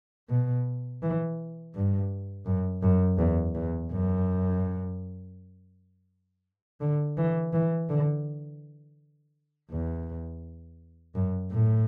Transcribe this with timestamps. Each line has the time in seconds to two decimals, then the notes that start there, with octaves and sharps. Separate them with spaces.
0.30 B2
1.02 E3
1.75 G2
2.46 F#2
2.82 F#2
3.18 E2
3.55 E2
3.91 F#2
6.81 D3
7.17 E3
7.53 E3
7.89 D3
9.71 E2
11.15 F#2
11.51 A2